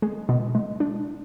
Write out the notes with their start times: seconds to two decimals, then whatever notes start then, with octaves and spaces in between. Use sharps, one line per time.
0.02 G#3
0.29 B2
0.55 G#3
0.80 D4